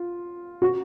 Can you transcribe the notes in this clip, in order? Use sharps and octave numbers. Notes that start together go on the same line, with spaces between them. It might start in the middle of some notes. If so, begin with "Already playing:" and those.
Already playing: F4
F#4